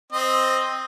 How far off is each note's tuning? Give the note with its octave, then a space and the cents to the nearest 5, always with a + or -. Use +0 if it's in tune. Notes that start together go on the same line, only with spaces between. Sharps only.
C4 +0 D#5 +0